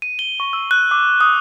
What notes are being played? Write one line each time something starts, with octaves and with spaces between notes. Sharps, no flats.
D#7
G7
C#6
E6
F#6
D6
D#6